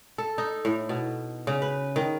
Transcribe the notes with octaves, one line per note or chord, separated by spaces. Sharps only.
A4
D#4
A2
B2
C#3
B4
D#3